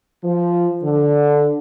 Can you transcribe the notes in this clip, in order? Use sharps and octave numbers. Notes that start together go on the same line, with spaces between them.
F3
D3